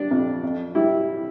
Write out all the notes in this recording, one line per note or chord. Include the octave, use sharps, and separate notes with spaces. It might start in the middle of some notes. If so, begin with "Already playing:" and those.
Already playing: G3 D4
F2
F2
G3 E4